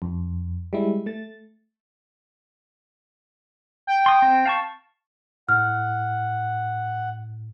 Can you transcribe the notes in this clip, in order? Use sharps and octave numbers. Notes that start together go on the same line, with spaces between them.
F2
G3 G#3 E4
A3 A6
G5
C6 D#6
C4
F5 A5 C#6
A2 F#5 F6